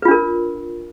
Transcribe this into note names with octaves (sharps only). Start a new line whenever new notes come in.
D4 F4 A#4 B4